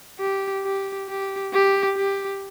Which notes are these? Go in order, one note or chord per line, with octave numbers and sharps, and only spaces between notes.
G4
G4
G4
G4
G4